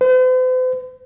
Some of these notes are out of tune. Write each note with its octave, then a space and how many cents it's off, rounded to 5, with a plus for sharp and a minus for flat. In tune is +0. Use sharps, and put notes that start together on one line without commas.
C5 -45